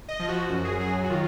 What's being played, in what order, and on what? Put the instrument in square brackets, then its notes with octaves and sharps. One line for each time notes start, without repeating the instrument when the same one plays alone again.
[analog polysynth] D#5
F3
F#4
F#2 F#4
G#4
F#3 G#4
F#4
D#3 F4